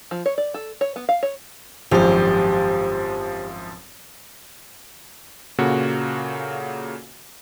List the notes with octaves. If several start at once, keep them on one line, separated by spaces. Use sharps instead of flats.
F3
C#5
D5
A4
C#5
B3
F5
C#5
G#1 F#2 F3 G4 C5
A#2 C#3 A#3 F#4 A4 F#5